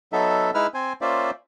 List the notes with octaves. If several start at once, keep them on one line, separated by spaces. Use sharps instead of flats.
F#3 B3 D#4 A4 E5
G#3 D#4 E4 B4 E6 F6
C4 C5 G#5
A#3 C#4 F4 C5 D5 E5